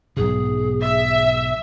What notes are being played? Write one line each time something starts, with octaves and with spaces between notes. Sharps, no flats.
B1 G#2 B2 G#4
E5